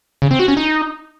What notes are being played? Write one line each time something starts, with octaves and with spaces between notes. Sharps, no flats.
C#3
C4
F#4
C#4
D#4